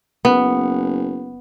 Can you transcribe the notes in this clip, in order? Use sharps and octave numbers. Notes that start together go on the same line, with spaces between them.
F#1 B3